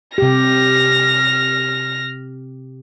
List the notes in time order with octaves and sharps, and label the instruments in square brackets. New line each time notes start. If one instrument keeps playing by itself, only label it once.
[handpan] C3 G4 [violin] F6 A#6